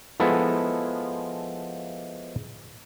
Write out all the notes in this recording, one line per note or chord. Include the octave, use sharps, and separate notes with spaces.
F3 G#3 B3 E4 A4